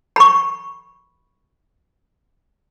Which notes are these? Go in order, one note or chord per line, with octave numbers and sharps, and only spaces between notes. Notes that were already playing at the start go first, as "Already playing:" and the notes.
B5 C#6